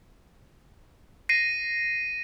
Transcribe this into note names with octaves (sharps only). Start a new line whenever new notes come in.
A#6 C7 D#7